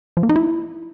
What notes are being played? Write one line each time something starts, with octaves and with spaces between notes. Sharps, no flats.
F3
A#3
D#4
E4